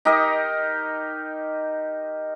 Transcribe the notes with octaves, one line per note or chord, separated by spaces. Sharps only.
D#4 G4 A#4 D#5